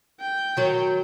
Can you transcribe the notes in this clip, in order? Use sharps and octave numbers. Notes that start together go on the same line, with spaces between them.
G5
D#3 F#3